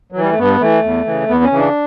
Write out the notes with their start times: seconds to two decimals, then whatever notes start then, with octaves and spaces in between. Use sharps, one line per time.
0.12 F#3
0.16 E3
0.21 G3
0.30 A3
0.38 G2 B3
0.61 E3 A3
0.84 E2
1.06 C#3 E3
1.29 E2 B3
1.44 C#4
1.51 C#3 E3
1.58 D4